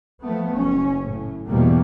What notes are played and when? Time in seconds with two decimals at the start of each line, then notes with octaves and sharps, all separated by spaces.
0.24 F3 A3 B3
0.56 F#1 C#4
1.03 A2
1.47 E2 G#2 B2 G3 A#3